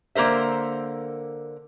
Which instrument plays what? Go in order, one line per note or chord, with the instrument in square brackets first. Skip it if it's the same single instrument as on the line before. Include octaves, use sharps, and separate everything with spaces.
[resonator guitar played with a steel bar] D3 A#3 A#4 C5 E5